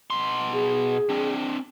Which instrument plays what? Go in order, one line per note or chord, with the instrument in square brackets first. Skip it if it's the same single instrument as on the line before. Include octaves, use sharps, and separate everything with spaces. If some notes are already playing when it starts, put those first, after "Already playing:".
[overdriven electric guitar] B2 C6
[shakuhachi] G#4
[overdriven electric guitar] C4 D4